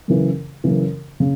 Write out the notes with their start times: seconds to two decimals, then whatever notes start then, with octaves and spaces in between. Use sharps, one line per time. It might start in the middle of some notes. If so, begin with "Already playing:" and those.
0.08 F#2 C#3 E3
0.64 F#2 C#3 E3
1.20 C#3